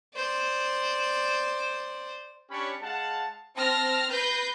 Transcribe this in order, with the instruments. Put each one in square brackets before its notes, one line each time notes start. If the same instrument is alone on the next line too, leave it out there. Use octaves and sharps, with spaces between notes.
[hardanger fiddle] C5 D5
[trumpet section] C#4 D4 G4 C#5 B5 C#6
G#3 F5 F#5 A5
[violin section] C4 A5 F6 A#6
B4 G6 A#6 C7